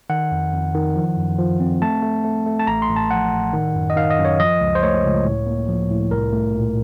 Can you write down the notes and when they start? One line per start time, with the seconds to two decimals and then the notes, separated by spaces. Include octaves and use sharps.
0.10 D#3 F#5
0.31 F2
0.53 F2
0.75 D#3
0.96 F3
1.17 F#2
1.39 F3
1.60 C4
1.82 A3 A5
2.03 A3
2.24 A3
2.46 A3
2.59 A5
2.67 A1 A#5
2.82 C6
2.89 A1
2.96 A5
3.11 F3 F#5
3.33 A2
3.53 D#3
3.75 F#2
3.90 D#5
3.96 D#3 F5
4.11 D#5
4.18 F#2
4.25 C#5
4.40 F3 D#5
4.61 C#2
4.75 C5
4.82 A3 C#5
5.04 C#2
5.25 A2
5.47 A#3
5.68 F3
5.90 A2
6.11 C2 A#4
6.33 A3
6.55 A#2